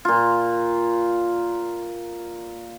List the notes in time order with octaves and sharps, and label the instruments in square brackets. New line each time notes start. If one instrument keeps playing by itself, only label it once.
[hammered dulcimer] A#2 F4